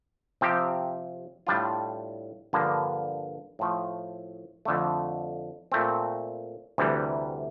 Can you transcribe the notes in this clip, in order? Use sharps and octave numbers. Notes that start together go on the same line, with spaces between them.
C3 F3 C4 G4
A2 G3 D4 F4
G2 D3 F3 A#3
A2 F3 A3
F2 D3 A3
A#2 A3 C4
D2 C3 E3 G3